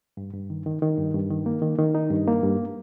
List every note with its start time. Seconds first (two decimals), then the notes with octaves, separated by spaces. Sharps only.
0.17 G2
0.33 G2
0.50 D#3
0.66 D#3
0.82 D#3
0.98 G2
1.14 G2
1.30 D#3
1.46 A#3
1.62 D#3
1.78 D#3
1.95 D#4
2.11 G2
2.28 A#3
2.43 G2